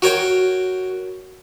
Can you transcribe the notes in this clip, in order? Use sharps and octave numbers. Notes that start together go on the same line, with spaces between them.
F#4 A#4 C#5 G5